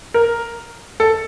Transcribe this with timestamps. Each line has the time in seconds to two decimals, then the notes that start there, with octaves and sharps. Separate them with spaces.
0.14 A#4
1.00 A4